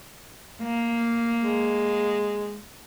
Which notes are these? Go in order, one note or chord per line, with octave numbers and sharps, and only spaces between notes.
A#3
G#3